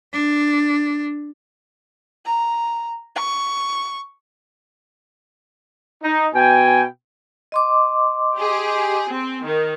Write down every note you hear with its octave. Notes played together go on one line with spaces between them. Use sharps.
D4
A#5
C#6
D#4
B2 G5 G#5
D#5 C6 D6
G4 G#4
C4
D#3